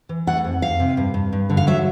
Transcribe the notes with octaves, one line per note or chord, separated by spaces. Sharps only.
E3
A3 F#5
F2
F2 F5
C3
G2
G2
G2
D3
F5
F#3 E5